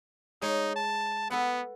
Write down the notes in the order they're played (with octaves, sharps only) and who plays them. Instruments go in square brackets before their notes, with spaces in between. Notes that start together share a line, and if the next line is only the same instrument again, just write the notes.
[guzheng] G#3 C#5 [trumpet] D#4
[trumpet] A5
[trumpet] B3 [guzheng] A4 B4 F#5